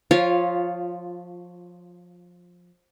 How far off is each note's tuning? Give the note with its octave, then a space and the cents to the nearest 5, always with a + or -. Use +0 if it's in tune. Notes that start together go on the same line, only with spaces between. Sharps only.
F3 +20 F4 +0 C#5 +0